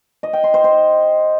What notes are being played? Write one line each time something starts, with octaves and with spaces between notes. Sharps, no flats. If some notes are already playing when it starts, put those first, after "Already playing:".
D#5
G5
C6
C5
C5